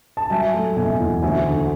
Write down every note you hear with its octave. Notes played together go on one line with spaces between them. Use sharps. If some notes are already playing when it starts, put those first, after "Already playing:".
A5
F#3 E5 G#5
A3
B2 E5 G#5
E2
D2 E5 G#5
D3